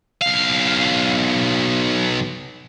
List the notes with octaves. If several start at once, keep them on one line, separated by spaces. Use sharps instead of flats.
B1 F5